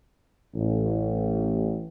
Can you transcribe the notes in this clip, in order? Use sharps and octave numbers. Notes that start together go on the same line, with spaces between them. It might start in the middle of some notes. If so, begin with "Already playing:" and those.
A1